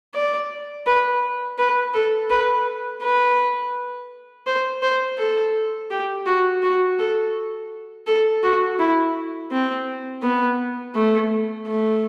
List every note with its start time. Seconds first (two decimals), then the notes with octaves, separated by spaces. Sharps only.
0.14 D5
0.86 B4
1.58 B4
1.94 A4
2.30 B4
3.02 B4
4.47 C5
4.82 C5
5.18 A4
5.90 G4
6.26 F#4
6.62 F#4
6.99 A4
8.07 A4
8.43 F#4
8.79 E4
9.51 C4
10.23 B3
10.95 A3
11.67 A3